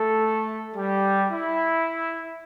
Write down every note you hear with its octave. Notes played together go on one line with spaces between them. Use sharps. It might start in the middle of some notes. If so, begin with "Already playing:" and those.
Already playing: A3 A4
G3 G4
E4